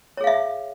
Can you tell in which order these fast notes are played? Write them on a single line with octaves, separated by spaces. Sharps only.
C#5 G#4 F5 E5